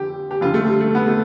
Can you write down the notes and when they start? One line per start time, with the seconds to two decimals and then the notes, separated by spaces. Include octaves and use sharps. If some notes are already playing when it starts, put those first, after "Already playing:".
Already playing: F2 D3 G4
0.31 G4
0.41 F2 D3 F4
0.54 A3
0.67 G3
0.80 A3
0.95 B3
1.07 A3